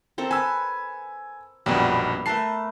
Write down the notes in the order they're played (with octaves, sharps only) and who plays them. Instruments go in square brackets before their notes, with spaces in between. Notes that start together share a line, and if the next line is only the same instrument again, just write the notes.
[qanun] C4 A4 A#4
[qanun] B4 [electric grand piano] G#5 E6
[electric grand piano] A#1 F#2 B2 [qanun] G3 B3
[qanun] A3 A#4 B4 [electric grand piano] A5 C7